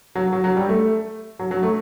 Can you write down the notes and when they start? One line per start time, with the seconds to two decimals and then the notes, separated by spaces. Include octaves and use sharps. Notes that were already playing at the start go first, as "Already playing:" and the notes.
0.15 F#3
0.33 F#3
0.44 F#3
0.57 G3
0.69 A3
1.39 F#3
1.51 F#3
1.63 A3